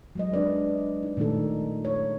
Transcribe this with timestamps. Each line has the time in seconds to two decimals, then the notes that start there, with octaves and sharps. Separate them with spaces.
0.15 F#3 G#3 D#5
0.33 D4 B4 D5
1.03 D#4
1.17 A#2 D#3 A3 D#4 A4
1.85 C#5